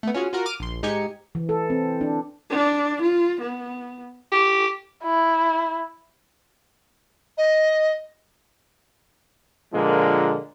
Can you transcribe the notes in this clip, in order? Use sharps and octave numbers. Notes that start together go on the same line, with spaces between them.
A3 B3
C#4 F4 F#4 G#4
F4 F#4 A#4
D6 F6 D7 D#7
A#1 C6
G#2 D#4 G4 G#5 C#7
E3
A4
C4
D4
D4
F4
B3
G4
E4
D#5
A#2 D3 F3 G#3 A#3